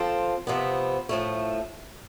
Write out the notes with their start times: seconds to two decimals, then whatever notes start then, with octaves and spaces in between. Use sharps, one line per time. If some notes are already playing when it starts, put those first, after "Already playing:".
Already playing: F3 C4 F4 A4
0.47 C3 F3 B3
1.09 A2 F3 A3